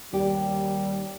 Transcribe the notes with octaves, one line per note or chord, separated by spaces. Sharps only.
D#2 G3 G4